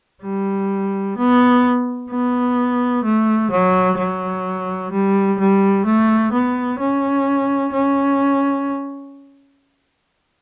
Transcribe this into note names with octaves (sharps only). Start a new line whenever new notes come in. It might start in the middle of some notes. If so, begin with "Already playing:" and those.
G3
B3
B3
A3
F#3
F#3
G3
G3
A3
B3
C#4
C#4